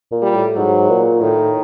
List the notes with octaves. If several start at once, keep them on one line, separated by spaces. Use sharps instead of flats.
A#2
G3
A2
G#2 F#3
A#2
A2 D#3